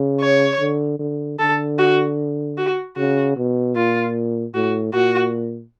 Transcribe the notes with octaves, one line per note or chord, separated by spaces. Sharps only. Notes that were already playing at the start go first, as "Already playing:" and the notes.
Already playing: C#3
C#5
D3
D3
D3 A4
F#4
F#4
C#3 F#4
B2
A#2 F4
A2 F#4
A#2 F#4